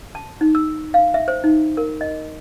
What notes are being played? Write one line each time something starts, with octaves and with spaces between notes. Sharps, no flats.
A5
D#4
E6
F5
E5
C5
D#4
A#4
D#5